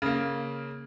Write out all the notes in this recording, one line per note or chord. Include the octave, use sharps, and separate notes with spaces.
C#3 A#3